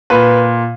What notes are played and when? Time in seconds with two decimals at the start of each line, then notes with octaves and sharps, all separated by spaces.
0.10 A#2 B4